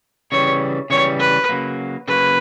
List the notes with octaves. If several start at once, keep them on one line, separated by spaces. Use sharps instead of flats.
C#3 E3 G3 C#5
C#3 E3 G3 C#5
B4
C#3 F#3 A#3
C#3 F#3 A#3 B4